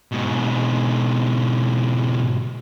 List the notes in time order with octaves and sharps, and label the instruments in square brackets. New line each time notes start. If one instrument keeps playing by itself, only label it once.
[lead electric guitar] G#2 B2